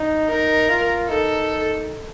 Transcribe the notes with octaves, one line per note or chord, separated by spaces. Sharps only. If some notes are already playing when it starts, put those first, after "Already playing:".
Already playing: D#4
D#4 A#4
F4
D#4 A4